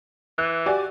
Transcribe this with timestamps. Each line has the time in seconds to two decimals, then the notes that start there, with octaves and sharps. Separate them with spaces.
0.38 E3 F#6
0.66 F#4 G4 D5 G#5